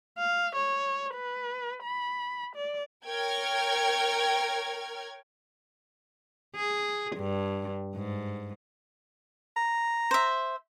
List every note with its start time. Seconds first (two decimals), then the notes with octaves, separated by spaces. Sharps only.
0.19 F5
0.56 C#5
1.15 B4
1.84 B5
2.56 D5
3.07 A#4 C#5 G5 F6 G#6
6.55 G#4
7.16 G2
7.95 G#2
9.57 A#5
10.11 C5 E5